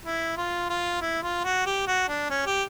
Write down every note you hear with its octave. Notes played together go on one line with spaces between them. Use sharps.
E4
F4
F4
E4
F4
F#4
G4
F#4
D4
C#4
G4